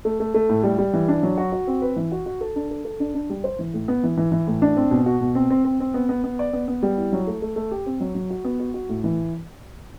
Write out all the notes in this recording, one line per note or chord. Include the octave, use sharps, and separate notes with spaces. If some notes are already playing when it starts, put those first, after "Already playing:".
A3
A3
A3
A2
G3
G3
E3
D4
F#3
F#4
F#4
C4
B4
E3
F#4
F#4
A4
D4
A4
A4
D4
D4
G3
C5
E3
A2
B3
E3
E3
E3
A2
D4
C4
B2
F#4
B2
C4
C4
C4
C4
B3
B3
B3
D5
B3
B3
G3
E4
F#3
A3
A3
A3
G4
C4
F#3
F#3
F#4
B3
F#4
F#4
A2
E3